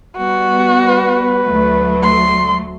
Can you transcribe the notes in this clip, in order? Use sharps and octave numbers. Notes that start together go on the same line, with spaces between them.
G3 B3 F#4
B4
D2 F#3 A3
C6